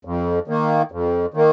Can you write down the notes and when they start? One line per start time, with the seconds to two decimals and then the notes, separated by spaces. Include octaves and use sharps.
0.05 F2
0.48 D#3 A#3
0.92 F2
1.34 D#3 A#3